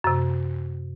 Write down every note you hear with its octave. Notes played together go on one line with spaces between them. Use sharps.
F#2 C3